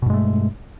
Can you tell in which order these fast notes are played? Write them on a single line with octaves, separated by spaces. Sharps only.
B2 G2 G#3 A3